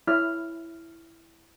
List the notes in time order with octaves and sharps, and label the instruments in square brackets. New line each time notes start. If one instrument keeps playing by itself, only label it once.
[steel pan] E4 C#5 E5 [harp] F6